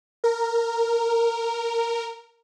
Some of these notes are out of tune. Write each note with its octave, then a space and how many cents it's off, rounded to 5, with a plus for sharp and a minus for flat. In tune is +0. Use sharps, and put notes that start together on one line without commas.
A#4 -10